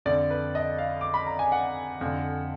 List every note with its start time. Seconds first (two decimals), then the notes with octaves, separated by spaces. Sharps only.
0.06 F2 D3 D5
0.30 B4
0.55 D#5
0.78 F5
1.01 D6
1.14 B5
1.27 A#5
1.39 G#5
1.52 F#5
2.01 F2 D3